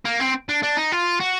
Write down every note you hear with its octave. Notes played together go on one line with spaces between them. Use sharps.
A#3
C4
D4
D4
D#4
F4
F#4